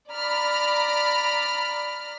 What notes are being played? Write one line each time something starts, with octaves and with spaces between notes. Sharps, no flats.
D5 A#5 B5 F6